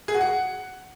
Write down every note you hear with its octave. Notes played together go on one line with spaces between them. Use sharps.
G#4
F#4
F#5